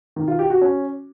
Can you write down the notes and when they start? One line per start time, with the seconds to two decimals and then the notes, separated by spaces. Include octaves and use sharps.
0.16 D#3
0.28 F4
0.39 G4
0.50 F#4
0.61 C#4